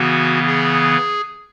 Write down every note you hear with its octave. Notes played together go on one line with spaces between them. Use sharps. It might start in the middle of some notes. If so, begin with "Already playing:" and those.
Already playing: C#3 E3 B3 F#4
G#4